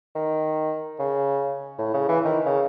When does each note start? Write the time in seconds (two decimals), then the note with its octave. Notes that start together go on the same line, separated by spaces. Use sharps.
0.15 D#3
0.99 C#3
1.78 A2
1.94 C#3
2.09 E3
2.25 D#3
2.46 C#3